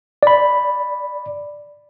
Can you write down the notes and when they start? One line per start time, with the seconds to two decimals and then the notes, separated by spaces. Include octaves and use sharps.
0.23 D5 B5